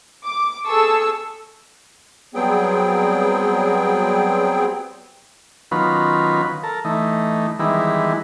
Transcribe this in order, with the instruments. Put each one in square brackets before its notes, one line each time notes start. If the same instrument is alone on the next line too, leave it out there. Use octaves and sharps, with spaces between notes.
[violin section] D6
G#4 A4 A5 C#6 E6
[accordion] F#3 G3 B3 C4 G#4 G5
[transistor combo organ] D#3 F#3 B3 C#4 F4 B4
A4 A#4
E3 A3 D#4
D#3 E3 G3 G#3 B3 E4